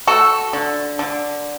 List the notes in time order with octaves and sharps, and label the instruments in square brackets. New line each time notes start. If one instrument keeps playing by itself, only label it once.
[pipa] A3 F#4 A4
D3
D3